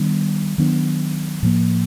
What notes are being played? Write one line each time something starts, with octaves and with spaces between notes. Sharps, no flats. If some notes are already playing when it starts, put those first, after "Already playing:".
Already playing: D#3 G3 B3 D4
D#3 F#3 B3 D4
A2 F3 A#3